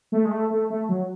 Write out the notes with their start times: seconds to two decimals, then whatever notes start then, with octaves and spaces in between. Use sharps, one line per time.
0.12 A3
0.25 G#3
0.31 A3
0.51 A3
0.70 A3
0.89 F#3